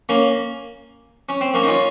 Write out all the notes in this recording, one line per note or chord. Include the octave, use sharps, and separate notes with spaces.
A#3 C#4
C#4
C4
A#3 C#4
D#4
C#4 F4